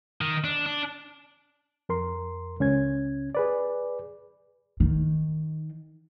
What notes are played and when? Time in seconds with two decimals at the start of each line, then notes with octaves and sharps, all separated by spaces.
0.21 D#3
0.44 D4
0.66 D4
1.89 F2 A#4 C6
2.60 C#2 C#4 G#6
3.35 G#4 B4 D5
4.80 D#3